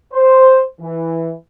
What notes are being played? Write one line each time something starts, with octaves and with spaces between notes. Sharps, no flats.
C5
E3